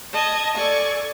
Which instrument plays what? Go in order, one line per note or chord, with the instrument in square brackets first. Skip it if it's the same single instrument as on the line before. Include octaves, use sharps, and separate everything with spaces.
[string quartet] D#5 A5 G#6
A4 D5 G#5 C#6